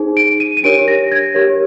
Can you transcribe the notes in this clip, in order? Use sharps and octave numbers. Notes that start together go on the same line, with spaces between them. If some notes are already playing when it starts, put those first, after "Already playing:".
Already playing: D#4 G#4 C5
D7
D#7
D#7
D4 G4 A#4 C#5 D7
A#6
G#6
G4 A#4 C#5